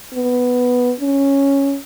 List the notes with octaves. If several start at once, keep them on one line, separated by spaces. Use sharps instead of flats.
B3
C#4